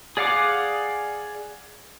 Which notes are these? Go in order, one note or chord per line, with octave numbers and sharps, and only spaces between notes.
G#4 D5 F5 F#5 D6